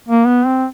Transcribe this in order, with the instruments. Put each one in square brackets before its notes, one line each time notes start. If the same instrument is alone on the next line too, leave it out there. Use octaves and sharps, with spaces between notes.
[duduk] A#3
B3
C4